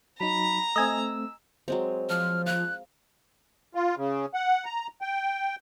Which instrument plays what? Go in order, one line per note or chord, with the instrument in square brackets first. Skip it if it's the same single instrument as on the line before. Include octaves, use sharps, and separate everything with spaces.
[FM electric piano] F#3 D#4 [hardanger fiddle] A#5 [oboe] B5
[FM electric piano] A3 C4 [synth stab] D#5 G#5 [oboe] E6
[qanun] F#3 G#3 C4
[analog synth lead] F3 [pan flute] F6
[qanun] F5 A#5 [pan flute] F#6
[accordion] F4
C#3
F#5
A#5
G5